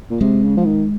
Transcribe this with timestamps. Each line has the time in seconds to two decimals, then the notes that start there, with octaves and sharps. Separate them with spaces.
0.10 A#2
0.21 C3 G#3
0.43 C#3
0.57 F3
0.65 D#3